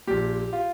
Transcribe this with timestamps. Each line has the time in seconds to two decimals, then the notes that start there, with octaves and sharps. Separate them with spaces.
0.07 A#1 A#2 G4
0.53 F4